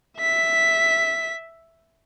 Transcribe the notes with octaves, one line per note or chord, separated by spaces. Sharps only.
E5 B6